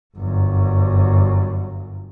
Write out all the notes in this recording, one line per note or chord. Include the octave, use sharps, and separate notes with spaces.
G1 F#2